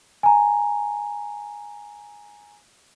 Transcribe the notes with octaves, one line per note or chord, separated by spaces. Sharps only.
G#5 A#5